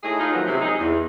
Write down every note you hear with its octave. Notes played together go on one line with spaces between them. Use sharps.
A2 D#4 G#4
D#4 F4 G#4
D#3 F3 F#3 A3 B3 C4
F#2 C3 F#3 G#3 E4
D#4 G#4
E2